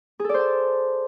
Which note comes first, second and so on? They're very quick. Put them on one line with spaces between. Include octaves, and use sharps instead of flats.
G#4 A4 D5 C5 A5